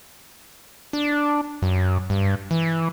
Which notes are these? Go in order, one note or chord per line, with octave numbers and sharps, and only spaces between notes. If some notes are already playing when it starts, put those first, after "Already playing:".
D4
F#2
G2
E3